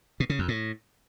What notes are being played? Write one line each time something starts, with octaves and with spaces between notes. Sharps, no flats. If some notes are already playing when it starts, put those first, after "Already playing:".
B2
C#3
F2
A2